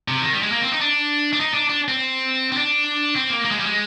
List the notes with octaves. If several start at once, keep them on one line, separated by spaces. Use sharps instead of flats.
C3
D#3
G3
G#3
A#3
C4
D#4
D4
D4
D#4
D4
D4
C4
C4
D4
C4
A#3
A#3
G#3
G3
G#3